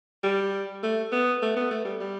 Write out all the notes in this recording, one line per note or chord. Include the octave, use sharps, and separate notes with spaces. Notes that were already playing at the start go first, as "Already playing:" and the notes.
G3
A3
B3
A3
B3
A3
G3
G3